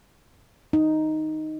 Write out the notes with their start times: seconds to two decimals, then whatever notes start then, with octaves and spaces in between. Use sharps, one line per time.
0.73 D#4